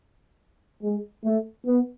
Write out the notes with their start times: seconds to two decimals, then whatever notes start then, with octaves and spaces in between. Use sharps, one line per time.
0.83 G#3
1.24 A3
1.66 B3